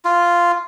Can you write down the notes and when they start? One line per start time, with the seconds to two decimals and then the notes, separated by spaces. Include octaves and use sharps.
0.05 F4